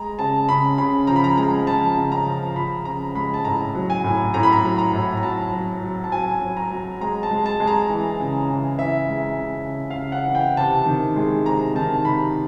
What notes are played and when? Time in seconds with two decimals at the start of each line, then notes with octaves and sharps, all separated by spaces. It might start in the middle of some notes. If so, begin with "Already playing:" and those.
Already playing: G#3 A#5
0.19 C#3 A5
0.49 C#3 B5
0.78 C#3 B5
1.07 F3 A#5
1.16 B5
1.24 A#5
1.37 G#3 A#5
1.67 F3 A5
1.97 C#3
2.12 A#5
2.26 F3
2.56 F3 B5
2.85 C#3 A#5
3.15 G#3 B5
3.34 A5
3.45 A2 A#5
3.75 F#3
3.90 G#5
4.04 A2
4.34 A2 A#5
4.43 B5
4.52 A#5
4.63 F#3
4.78 A#5
4.93 A2
5.17 A#5
5.23 F#3 A5
5.52 F#3
5.82 F#3
6.04 A5
6.12 F#3 G#5
6.42 F#3
6.57 A#5
6.71 F#3
7.01 G#3 A#5
7.23 A5
7.31 G#3
7.46 A5
7.60 G#3
7.67 A#5
7.90 E3
8.20 C#3
8.50 E3
8.79 E3 E5
9.09 G#3
9.38 C#3
9.68 C#3
9.90 F5
9.97 C#3
10.12 F#5
10.27 E3
10.35 G5
10.57 C3 A5
10.86 D#3
11.16 G#3
11.46 C3 A#5
11.75 D#3 A5
12.05 C3 B5